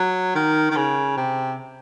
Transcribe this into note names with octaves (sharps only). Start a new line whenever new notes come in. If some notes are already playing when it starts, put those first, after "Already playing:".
Already playing: F#3
D#3
D#3
C#3
C3